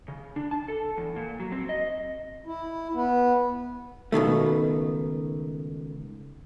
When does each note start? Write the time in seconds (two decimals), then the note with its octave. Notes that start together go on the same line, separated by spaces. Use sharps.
0.08 C#3
0.36 D4
0.51 A5
0.68 A4
0.97 E2
1.16 A#2
1.40 F#3
1.52 C4
1.69 D#5
2.46 E4
2.94 B3
4.12 C#2 B2 D#3 A3